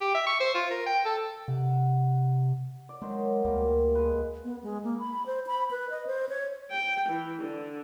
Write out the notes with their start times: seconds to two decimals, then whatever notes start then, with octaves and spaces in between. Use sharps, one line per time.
0.01 G4
0.14 E5
0.26 C#6
0.40 C5
0.55 F4
0.71 A#4
0.86 G5
1.05 A4
1.48 C3 F#5
2.89 D5
3.02 D#3 F#3 G#3 C5
3.45 D2 G3 A#3
3.95 G#3 B4
4.45 B3
4.63 G#3
4.84 A#3
4.99 B5
5.26 C5
5.47 B5
5.71 B4
5.90 D#5
6.07 C5
6.29 C#5
6.71 G5
7.10 E3
7.43 D3